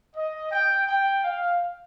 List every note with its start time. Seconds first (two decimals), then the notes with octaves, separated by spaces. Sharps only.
0.15 D#5
0.52 G5
0.88 G5
1.24 F5